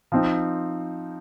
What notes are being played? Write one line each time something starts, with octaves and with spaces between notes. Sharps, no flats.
F3 C4 D#4